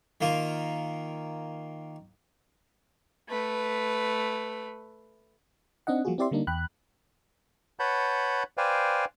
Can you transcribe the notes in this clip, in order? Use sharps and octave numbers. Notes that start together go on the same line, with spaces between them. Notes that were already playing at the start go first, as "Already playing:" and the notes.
D#3 A#3 F4
A3 B4
C4 D4 D#4 D#5 F#5
F3 G3 A#3 F4 F#4 G#4
C4 E4 G4 D5 E5 C6
D3 G3 A#3 D4 D#4
E2 G5 B5 F#6
B4 C#5 F#5 A5 B5 G6
B4 C5 D5 F5 G5 G#5